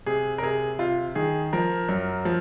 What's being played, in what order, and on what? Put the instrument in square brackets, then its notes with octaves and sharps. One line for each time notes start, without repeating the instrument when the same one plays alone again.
[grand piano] C3 G#4
A#4
C3 G#4
C3 F4
D#3 G#4
F3 A#4
F#2
F3